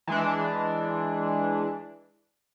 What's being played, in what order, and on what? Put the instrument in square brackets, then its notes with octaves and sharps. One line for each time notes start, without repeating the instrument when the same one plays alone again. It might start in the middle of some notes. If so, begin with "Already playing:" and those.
[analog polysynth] E3 G#3 D4